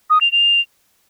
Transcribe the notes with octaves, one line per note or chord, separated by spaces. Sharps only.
D#6
F7
F7